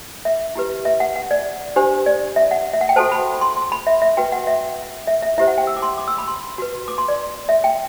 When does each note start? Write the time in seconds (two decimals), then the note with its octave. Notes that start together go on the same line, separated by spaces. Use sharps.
0.25 E5
0.55 E4 G4 B4
0.85 E5
1.00 F#5
1.16 F#5
1.31 D5
1.76 D4 G4 C5
2.06 D5
2.36 E5
2.51 F#5
2.73 E5
2.81 F#5
2.89 G5
2.96 F#4 A4 C5 A5
3.12 B5
3.41 C6
3.57 C6
3.72 B5
3.87 E5
4.02 E5
4.17 F#4 B4 G5
4.32 F#5
4.47 E5
5.07 E5
5.23 E5
5.38 E4 G4 C5 E5
5.48 F#5
5.58 G5
5.67 E6
5.77 D6
5.82 C6
5.98 D6
6.08 E6
6.18 B5
6.28 C6
6.58 F#4 B4
6.88 D6
6.98 C6
7.08 D5
7.49 E5
7.64 G5